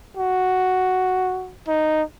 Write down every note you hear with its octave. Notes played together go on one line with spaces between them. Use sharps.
F#4
D#4